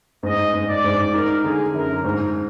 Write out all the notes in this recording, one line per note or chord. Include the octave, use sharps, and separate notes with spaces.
G#2 D#5
G#2
D5
G#2
D#4 A#4
D3 G#4
F#2 A#4
G#2